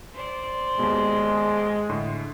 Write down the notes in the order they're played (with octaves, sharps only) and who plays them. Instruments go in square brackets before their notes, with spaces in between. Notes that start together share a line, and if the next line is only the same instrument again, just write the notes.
[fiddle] C5 D5
[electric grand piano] D#2 B2 [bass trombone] G#3
[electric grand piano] A2 D3 C6